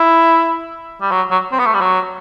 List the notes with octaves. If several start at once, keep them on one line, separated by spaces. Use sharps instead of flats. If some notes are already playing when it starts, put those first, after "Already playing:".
Already playing: E4
G3
F#3
F#3
C4
B3
A3
G3
F#3